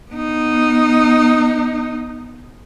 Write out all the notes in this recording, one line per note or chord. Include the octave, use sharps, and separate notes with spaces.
B3 D#4